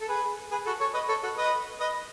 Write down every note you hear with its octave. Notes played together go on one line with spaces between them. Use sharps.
A4
G#4 B4
G#4 B4
F#4 A4
A4 C#5
B4 D#5
A4 C#5
F#4 A4
B4 D#5
B4 D#5